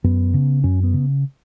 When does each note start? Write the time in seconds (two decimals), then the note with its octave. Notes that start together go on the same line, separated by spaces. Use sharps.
0.04 F#2 B3
0.34 C#3
0.64 F#2 C#4
0.83 B3
0.93 C#3